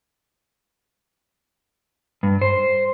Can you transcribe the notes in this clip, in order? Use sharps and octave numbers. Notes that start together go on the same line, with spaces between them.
G2
C5